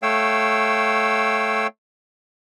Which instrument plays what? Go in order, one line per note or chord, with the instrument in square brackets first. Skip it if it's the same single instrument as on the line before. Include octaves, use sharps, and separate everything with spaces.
[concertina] A3 C#5 F5 G5 E6